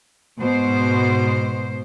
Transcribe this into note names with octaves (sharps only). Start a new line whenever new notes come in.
G#2 B2 C5